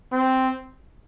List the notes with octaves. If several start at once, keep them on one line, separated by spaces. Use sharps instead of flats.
C4